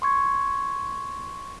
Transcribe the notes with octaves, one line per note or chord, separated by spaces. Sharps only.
C6 C#6 G#6